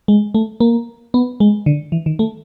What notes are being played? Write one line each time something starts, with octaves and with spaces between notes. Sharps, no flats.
G#3
A3
A#3
B3
G#3
D3
E3
D#3
A3